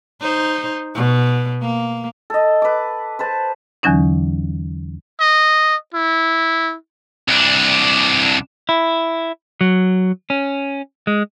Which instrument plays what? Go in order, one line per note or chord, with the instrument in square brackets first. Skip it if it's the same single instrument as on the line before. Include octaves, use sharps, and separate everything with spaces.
[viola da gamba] D#4 C5
B2
A#3
[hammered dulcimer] A4 D#5
B4 D6
B4 C5 A5
[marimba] E2 D3 E3 F#3 C#4 D#4
[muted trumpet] D#5
E4
[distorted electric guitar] C2 D4
[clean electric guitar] E4
F#3
C#4
G#3